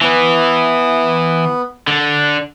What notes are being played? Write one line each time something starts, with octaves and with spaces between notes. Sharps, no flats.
E3 B3
D3